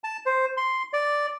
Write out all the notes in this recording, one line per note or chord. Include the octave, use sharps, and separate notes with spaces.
A5
C5
C6
D5